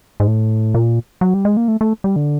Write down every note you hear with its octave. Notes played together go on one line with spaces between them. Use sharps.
G#2
A2
A#2
F#3
G3
G#3
A#3
A3
A3
G3
D3